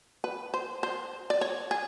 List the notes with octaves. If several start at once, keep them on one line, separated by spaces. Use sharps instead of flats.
B4
C5
C5
D5
C#5
G#4